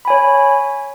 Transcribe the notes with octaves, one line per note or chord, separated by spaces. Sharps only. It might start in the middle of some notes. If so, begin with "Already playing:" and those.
C#5 G#5 B5